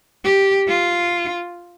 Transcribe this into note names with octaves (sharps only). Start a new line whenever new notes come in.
G4
F4